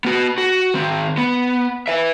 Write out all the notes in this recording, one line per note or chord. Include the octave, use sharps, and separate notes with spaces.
B3 F#4
F#4
D#3 C4
B3
B4 E5